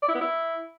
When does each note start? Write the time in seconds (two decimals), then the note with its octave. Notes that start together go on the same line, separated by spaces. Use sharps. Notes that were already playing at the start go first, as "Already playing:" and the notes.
0.02 D5
0.09 E4
0.15 B3
0.21 E4